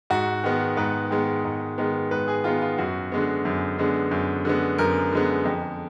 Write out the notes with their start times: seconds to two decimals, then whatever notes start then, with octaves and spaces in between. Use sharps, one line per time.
0.10 G#2 F#4
0.44 D#3 G#3 B3
0.77 G#2 B4
1.11 D#3 G#3 B3
1.45 G#2
1.78 D#3 G#3 B3
2.11 G#2 B4
2.28 G#4
2.44 D#3 G#3 B3 F4
2.61 F4
2.78 F#2 F#4
3.12 D3 G#3 B3
3.45 F#2
3.78 D3 G#3 B3
4.11 F#2
4.45 D3 G#3 B3
4.78 F#2 A#4
5.12 D3 G#3 B3
5.45 F2